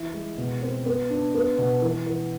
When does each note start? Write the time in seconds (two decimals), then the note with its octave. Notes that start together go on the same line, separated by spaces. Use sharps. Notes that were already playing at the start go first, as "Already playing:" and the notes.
Already playing: E3 E4
0.14 G#3
0.37 B2
0.62 C4
0.86 B3
1.10 D4
1.35 B3
1.58 B2
1.82 E3
2.06 E3